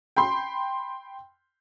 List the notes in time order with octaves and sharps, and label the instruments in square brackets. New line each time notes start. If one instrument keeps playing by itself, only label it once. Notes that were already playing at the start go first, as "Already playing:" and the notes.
[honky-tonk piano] G5 B5 C6